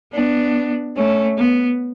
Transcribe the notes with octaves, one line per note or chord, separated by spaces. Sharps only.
B3 D4
A3 C#4
B3